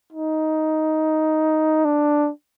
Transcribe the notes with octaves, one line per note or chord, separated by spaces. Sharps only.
D#4
D4